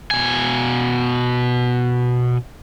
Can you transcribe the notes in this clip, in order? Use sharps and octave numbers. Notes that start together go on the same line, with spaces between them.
B2 G#5